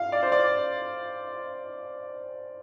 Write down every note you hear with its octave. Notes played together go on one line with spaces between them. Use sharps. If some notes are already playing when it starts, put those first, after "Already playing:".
Already playing: F5
D5
C5
D5